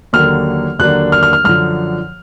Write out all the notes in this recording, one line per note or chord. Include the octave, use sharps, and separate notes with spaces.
D#2 D3 F#3 A#3 F6
D#2 D3 F#3 A#3 D4 F#6
F6
F6
F6
F#2 D3 F3 F6